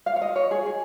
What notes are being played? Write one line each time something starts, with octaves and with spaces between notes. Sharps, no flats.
F5
C#5
D#5
C#5
G#4
G#4